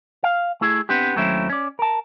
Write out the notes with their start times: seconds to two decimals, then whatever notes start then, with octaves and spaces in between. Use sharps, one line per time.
0.24 F5
0.61 A3 E4 G#4
0.89 B3 C4 D4 G4
1.16 D#2 F#3 A3 C4 C#4 E4
1.50 C#4 D5
1.79 A#4 A5